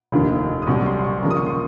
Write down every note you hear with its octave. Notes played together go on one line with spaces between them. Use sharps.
F1 D#2 D#3
D#6
C2 C3 F#3 C#6
C6
C6
C#6
D#2 C#3 F3 A#3 A#5
D#6
C#6
C6
C#6